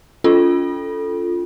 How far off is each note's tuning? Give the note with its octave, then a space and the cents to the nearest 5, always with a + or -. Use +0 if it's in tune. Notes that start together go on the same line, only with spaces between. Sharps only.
C#4 +40 F4 +0 A4 +0